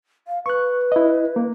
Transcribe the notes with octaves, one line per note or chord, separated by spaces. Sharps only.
F5
B4 C#6 F#6
E4 D#5
A#3